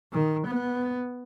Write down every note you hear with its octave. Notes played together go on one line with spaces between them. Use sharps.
D#3
B3